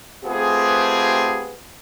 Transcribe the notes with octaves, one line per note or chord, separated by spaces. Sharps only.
A3 B3 C4 F4 G4 G#4